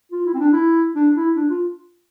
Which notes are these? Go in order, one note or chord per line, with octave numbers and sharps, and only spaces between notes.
F4
E4
C4
D4
E4
D4
E4
D4
F4